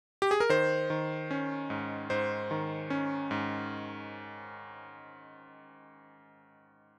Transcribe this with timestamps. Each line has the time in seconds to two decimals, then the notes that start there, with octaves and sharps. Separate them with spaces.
0.22 G4
0.31 G#4
0.40 A#4
0.49 D#3 C5
0.90 D#3
1.31 C#4
1.70 G#2
2.10 G#2 C5
2.51 D#3
2.90 C#4
3.31 G#2